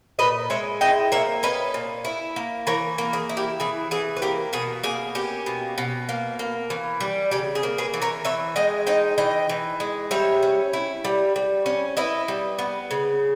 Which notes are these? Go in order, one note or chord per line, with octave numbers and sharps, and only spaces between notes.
A#2 B4 D#5
G#3 C#5 E5
E4 D#5 G5
A#3 C#5 E5
C#4 B4 D#5
A#2
E4
A#3
E3 A#4 C#5
A#3
G#4
E4
G4
E3 G#4
E3 G#4
B4
A#3 G4 A#4
B2 G#4
A#3 G#4
C#4 G4
B2
B2
A#3
A#3
E3
G3
C#3 G4
G#4
A#3
G#4 B4
E3
A#4 C#5
E3 C#5 E5
G#3 D#5 G5
D#4 D#5 G5
E3 D#5 G5
E3
G#3
G3 C#5 E5
C#4
E4
G3
G3
C#4
E4 B4 D#5
G3
B3
C#3